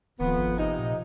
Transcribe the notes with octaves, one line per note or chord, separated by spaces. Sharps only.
D1 F2 D#3 F3 B3
G#1 G5
C3 D#4 G#5
A#2